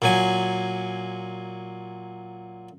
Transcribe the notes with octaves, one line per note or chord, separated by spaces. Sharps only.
A#2 F#3 G#5